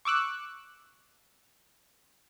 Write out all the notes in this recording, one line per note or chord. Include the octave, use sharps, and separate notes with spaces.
C#6 D6 E6 F#6